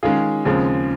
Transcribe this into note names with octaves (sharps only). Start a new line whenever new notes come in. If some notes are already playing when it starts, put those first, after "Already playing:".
D#3 G#3 C#4 F4 G#4
D#2 C#3 F3 G#3 C4